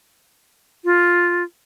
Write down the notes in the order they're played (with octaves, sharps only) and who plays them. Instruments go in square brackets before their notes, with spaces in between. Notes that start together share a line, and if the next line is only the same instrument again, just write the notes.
[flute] F4